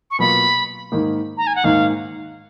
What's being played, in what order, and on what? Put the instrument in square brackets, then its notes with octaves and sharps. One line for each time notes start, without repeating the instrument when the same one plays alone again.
[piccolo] C#6
[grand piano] B2 F#3 A#3 F4 [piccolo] B5
[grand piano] G#2 D#3 A#3 D#4
[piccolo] A#5
G#5
F#5
[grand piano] G#2 D#3 A#3 D#4 [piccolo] F5